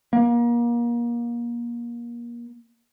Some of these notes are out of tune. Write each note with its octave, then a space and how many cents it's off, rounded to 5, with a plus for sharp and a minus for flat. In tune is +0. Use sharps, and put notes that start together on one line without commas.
A#3 +30